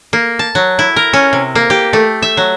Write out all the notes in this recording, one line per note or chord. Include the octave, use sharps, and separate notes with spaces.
A#3
A5
F#3
E4
A#4
C#4
C3
A#3
G4
A3
E5
F#3